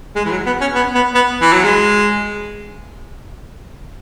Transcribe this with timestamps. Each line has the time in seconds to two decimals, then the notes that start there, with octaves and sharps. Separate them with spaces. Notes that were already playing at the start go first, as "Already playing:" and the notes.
0.16 G#3
0.25 E3
0.31 F#3
0.46 B3
0.61 C#4
0.75 B3
0.95 B3
1.15 B3
1.41 E3
1.53 F#3
1.64 G#3